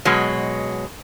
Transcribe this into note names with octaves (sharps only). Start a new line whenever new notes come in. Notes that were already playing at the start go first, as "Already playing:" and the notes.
B2 F#3 G#3